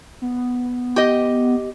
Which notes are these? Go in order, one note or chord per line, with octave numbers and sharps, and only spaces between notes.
B3
G4 D#5